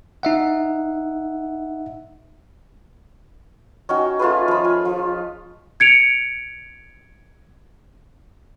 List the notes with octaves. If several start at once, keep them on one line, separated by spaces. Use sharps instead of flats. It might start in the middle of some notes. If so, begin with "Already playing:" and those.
D#4 E5 F#5
C#4 D#4 F#4 G5
A3 F4 G#4 B4
F3 B5
G#5
F3
G#6 C#7 D7 F7